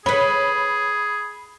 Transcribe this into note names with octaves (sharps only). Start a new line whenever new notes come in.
G#4 B4 C#5 B5